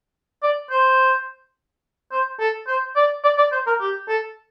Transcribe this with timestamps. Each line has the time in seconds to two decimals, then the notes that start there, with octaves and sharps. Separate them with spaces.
0.43 D5
0.71 C5
2.12 C5
2.40 A4
2.67 C5
2.96 D5
3.24 D5
3.38 D5
3.52 C5
3.67 A#4
3.81 G4
4.09 A4